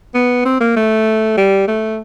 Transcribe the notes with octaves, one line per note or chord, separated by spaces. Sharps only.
B3
C4
A#3
A3
G3
A3